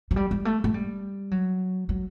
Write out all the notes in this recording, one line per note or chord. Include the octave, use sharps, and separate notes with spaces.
F#3
G3
G3
A3
A3
G3
F#3
F#3